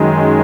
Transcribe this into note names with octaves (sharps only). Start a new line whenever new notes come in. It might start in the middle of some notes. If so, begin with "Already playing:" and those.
Already playing: F#2 D#3 G#3